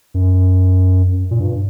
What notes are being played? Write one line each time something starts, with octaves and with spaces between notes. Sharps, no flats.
F#2
A#2
G2